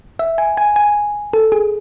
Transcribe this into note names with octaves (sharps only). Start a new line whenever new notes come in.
E5
G#5
G#5
G#5
A4
G#4